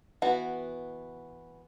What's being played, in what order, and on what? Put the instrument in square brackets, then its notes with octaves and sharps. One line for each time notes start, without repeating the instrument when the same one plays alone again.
[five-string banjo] E3 B3 F#4